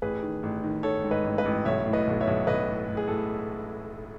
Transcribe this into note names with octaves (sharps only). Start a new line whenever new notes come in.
A1 G#4 B4
D#3
A1
D#3
D#3 A4 C#5
G#2
B4 D#5
A1
B4 D#5
A1
B1 C#5 E5
A2
B4 D#5
B1
C#5 E5
B1
B1 B4 D#5
A2
A2
G#4
A2 A4